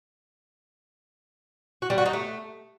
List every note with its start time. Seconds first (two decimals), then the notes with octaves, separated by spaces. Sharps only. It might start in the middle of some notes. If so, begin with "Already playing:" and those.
1.82 F#4
1.90 G3
1.98 F#4
2.06 D#4
2.13 A3